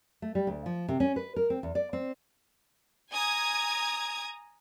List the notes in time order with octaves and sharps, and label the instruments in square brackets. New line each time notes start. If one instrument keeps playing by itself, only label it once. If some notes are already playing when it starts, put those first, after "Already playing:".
[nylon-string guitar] A3
G3
D2
F3
C3
C#4
B4
A#4
C4
E2
D5
C4
[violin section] G#5 A#5 D#6 G#6